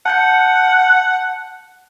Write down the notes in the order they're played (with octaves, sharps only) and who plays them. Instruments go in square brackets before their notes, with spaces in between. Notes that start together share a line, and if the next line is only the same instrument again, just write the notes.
[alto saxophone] F#5 [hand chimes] A5 G6 C#7